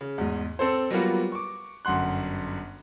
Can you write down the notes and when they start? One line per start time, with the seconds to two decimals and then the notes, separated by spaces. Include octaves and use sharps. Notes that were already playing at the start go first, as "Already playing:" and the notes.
0.01 C#3
0.18 E2 G#2
0.59 C4 A4 C5
0.90 F#3 G3 A#3 B3 F4 F#4
1.32 C#6 D6
1.85 G1 F#2 F#5 C6 F#6